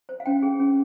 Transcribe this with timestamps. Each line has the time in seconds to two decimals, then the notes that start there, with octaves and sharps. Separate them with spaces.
0.09 C5
0.20 F5
0.26 C#4 G5
0.43 G#4
0.60 C#4